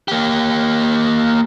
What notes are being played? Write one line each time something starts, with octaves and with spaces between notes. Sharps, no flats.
A#3 G4